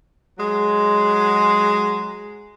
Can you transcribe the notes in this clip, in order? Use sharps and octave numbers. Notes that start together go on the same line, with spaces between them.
F#3 G#3